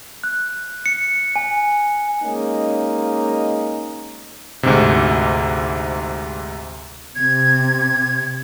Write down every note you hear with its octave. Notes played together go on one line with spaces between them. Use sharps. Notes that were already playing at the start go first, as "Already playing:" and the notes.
F#6
C#7
G#5
G#3 A#3 C#4 D#4
D2 G#2 C3
C3 G#6